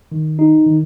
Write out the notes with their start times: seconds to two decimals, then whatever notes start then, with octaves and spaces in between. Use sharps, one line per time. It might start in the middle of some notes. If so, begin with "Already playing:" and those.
0.12 D#3
0.39 D#4
0.66 D#3